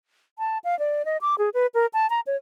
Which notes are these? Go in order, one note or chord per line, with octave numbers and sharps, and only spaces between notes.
A5
F5
D5
D#5
D6
G#4
B4
A#4
A5
A#5
C#5